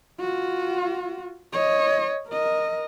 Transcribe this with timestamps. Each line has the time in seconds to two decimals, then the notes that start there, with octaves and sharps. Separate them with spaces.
0.20 F4 F#4
1.53 C#5 D#5
2.29 A#4 D#5